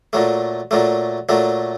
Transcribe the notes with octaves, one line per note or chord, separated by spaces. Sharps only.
A#2 F#3 A3
A#2 F#3 A3
A#2 F#3 A3